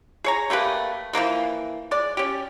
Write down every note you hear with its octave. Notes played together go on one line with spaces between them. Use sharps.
G#4 C#5 A#5
A3 A#3 G4 B4
E3 F3 A#3 B3
G#3 D5
C#4 G4